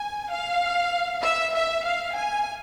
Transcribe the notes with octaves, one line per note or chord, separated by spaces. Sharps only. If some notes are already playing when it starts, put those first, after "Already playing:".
Already playing: G#5
F5
E5
E5
F5
G#5